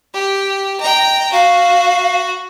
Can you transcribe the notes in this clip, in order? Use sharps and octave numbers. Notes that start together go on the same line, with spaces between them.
G4
D#5 G5 A#5
F#4 F5